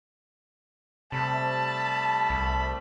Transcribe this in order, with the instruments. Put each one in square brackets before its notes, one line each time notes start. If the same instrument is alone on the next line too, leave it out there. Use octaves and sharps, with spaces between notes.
[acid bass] C3 [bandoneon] G3 A3 [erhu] A5 [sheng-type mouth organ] B5
[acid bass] C2